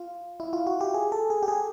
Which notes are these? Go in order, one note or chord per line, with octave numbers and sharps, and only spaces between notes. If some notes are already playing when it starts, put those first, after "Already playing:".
Already playing: F4
E4
F4
F#4
G4
G#4
A4
G#4
G4
G#4